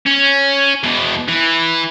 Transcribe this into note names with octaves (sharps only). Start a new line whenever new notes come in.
C#4
E2 B2
E3